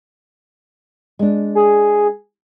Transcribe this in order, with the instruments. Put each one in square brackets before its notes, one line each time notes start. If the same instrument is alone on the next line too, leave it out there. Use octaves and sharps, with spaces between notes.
[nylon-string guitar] G#3 D4
[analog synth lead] G#4